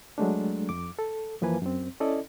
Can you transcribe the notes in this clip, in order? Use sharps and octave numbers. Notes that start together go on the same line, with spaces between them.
F#3 G#3 A3 D4
F2 D6
A4
F#2 E3 F3 A#3 B4 G#5
F#2 C4
C#4 E4 A4 D5 D#5